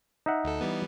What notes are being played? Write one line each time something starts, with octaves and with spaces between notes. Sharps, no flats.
D#4 E5 F#5
D2 A4
E3 G3 B3